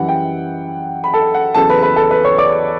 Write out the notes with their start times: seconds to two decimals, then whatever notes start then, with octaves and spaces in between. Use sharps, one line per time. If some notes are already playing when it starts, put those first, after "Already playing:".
Already playing: F#2 E3 G3 F#5
0.08 G5
1.04 B5
1.13 A4 A5
1.34 F#5
1.54 E2 C#3 F#3 A4 A5
1.69 B4 B5
1.82 B4 B5
1.96 A4 A5
2.11 B4 B5
2.24 C#5 C#6
2.38 D5 D6